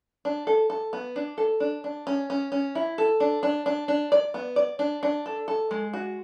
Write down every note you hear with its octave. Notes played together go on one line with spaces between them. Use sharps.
D4
A4
A4
B3
D4
A4
D4
D4
C#4
C#4
C#4
E4
A4
D4
D4
D4
D4
D5
B3
D5
D4
D4
A4
A4
G#3
F#4